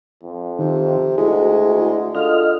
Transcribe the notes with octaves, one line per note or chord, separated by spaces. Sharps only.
F2
C3 D#3
D2 G#3 E4 F#4 G#4
D3 F4 D#5 F6